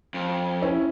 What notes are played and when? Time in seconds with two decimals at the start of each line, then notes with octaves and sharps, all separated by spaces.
0.14 F2
0.62 C#4 E4